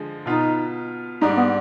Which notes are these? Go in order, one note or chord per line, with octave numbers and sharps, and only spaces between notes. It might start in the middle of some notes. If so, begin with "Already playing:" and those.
Already playing: D3 F3 G#3
B2 B3 D#4 F4
G#2 G3 D4 D#4
B3